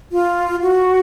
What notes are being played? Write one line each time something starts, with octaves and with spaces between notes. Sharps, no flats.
F4
F#4